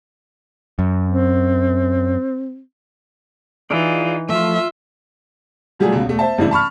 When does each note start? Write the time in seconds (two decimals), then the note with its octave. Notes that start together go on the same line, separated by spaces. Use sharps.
0.79 F#2
1.06 C4
3.71 E3 D#4 F4 G#4 D5
4.29 F3 A3 F4 E5
5.79 B2 F#3 G3 A3 F4 G#4
5.92 C#2 B2
6.05 E1 A3
6.19 C5 E5 A5
6.38 F#1 G2 C3 E3 A3 E4
6.51 A5 B5 C#6 F6